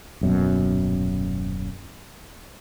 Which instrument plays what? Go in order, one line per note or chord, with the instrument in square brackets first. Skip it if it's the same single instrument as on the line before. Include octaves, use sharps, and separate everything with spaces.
[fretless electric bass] D#1 F#2 B2